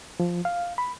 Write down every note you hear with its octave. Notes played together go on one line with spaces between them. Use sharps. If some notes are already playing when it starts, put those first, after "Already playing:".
F3
F5
B5